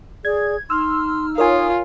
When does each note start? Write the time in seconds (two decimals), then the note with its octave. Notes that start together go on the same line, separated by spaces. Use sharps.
0.25 G#4 D5 G#6
0.70 D#4 C6 E6 F6
1.38 F4 A#4 C#5 G#5 D#6